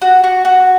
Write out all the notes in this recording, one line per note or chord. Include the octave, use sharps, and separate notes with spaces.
F#4
F#4
F#4